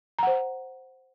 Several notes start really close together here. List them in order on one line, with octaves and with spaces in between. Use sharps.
A#5 F#5 C5